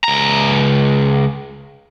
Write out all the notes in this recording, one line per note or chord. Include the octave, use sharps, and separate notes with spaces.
C#2 A#5